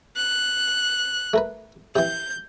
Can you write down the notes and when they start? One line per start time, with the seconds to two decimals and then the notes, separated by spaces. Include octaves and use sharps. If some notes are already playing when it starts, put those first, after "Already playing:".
0.17 F#6
1.33 A3 A#4 B4
1.96 C3 E3 G6